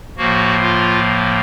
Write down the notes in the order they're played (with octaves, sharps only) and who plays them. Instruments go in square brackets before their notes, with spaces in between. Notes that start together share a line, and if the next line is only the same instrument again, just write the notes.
[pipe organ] A2 F3 A#3 F#4
F4